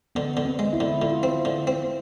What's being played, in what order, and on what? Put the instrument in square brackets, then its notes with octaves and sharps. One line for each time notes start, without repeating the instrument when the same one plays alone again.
[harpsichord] D3 [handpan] B3
[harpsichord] D3
[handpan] C4
[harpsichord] G#3
[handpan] E4
[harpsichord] D3
[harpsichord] D3 [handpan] F4
[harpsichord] C4
D3
C4